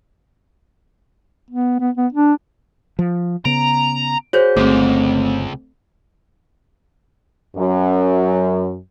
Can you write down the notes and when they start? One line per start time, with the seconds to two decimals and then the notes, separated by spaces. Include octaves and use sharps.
1.51 B3
1.80 B3
1.97 B3
2.13 D4
2.99 F3
3.45 C#3 B3 A#5 D7
4.33 F#4 G#4 C5 C#5 G6
4.57 G1 C#2 G#3 A3 C4
7.56 F#2